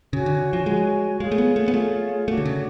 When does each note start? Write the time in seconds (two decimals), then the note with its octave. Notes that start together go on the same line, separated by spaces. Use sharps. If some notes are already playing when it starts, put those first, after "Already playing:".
0.12 C#3 F#4 C#5 G#5
0.26 D3
0.53 F3
0.66 G#3 F#4 C#5 G#5
1.20 G#3 F4 G#4 C#5 F5
1.32 A3
1.38 B3
1.56 A3
1.68 B3
1.74 A3 F4 G#4 C#5 F5
2.27 A3 D4 F#4 C#5
2.37 D3
2.45 C#3